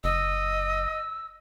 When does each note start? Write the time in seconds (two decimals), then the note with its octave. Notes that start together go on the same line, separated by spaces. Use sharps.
0.04 F#1 D#5 E6